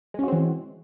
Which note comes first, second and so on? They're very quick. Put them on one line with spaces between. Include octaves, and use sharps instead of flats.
G#3 C#4 F#4 C4 E3